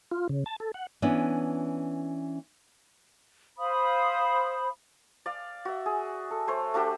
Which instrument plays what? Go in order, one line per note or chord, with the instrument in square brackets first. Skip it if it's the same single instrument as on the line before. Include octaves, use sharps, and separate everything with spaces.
[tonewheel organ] F4
C#3
A5
A4
F#5
[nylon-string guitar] E3 B3 C#4 D4
[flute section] C5 F5 B5 D#6
[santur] D5 F5
F#4 E5
G#4
A4
A3 C5 C#5
A3 D4 F#4 G4